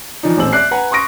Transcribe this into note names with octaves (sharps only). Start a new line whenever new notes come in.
E3 F3 D4 D#4
D#1 A1 C4 E6 F#7
D5 E5 F#6 C7
B4 F#5 G#5 A#5
C6 C#6 D#6 A#6 D7